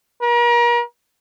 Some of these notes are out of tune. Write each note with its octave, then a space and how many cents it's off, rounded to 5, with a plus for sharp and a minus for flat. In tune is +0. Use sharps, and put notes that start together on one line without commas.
A#4 +40